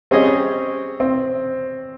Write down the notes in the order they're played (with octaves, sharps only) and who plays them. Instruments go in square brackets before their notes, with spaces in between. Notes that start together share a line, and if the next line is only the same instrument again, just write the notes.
[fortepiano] G3 C#4 G#4 D#5 [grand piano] C4
[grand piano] C4